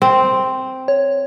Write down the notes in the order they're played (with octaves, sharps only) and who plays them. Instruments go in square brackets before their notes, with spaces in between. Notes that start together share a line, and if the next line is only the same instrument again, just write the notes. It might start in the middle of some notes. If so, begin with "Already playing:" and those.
[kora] C4
[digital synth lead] C#5